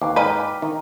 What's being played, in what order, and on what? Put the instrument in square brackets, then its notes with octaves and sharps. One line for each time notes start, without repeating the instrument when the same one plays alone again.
[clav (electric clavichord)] D#2 [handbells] B4 F5 D6
[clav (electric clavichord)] G#2 [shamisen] B4 D#5 [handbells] G5 F6 B6
[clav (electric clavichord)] D#3 [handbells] D#4 A#5